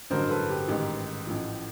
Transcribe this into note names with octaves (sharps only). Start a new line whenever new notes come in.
A1 G2 D3 F#3 A#4 C5
A4 B4
G4
A1 G#2 D#3 G4
A1 A2 F3